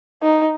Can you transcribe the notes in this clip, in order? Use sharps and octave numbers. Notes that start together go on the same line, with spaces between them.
D#4